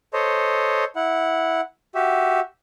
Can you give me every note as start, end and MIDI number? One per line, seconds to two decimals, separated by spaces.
0.13 0.84 69
0.13 0.84 72
0.13 0.84 73
0.13 0.84 75
0.96 1.61 64
0.96 1.61 78
1.95 2.40 66
1.95 2.40 67
1.95 2.40 76